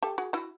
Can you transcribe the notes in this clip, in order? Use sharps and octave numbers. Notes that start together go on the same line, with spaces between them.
G4 A4
F#4 G#4
E4 F#4